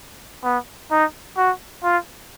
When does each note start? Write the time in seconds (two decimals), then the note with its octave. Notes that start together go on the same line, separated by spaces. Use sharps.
0.44 B3
0.91 D#4
1.37 F#4
1.83 F4